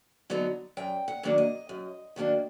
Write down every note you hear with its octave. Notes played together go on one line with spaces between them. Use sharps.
D3 F#3 B3 D#4
F#2 G5
F#5
D#3 F#3 A#3 D4
D#5
F#2
D#3 F#3 A#3 D4